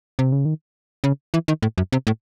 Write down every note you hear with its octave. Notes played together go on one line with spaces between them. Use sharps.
C3
C#3
D#3
C#3
E3
D#3
A2
F#2
C3
A2